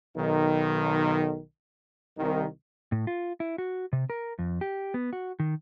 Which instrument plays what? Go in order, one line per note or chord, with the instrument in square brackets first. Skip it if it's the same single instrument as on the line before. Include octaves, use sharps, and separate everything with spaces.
[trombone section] B1 D#3
C2 D#3
[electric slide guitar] A2
F4
E4
F#4
C3
A#4
F2
G4
B3
F#4
D#3